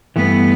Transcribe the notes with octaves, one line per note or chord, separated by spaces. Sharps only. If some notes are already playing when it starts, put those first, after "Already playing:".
G2 E3 A3 B3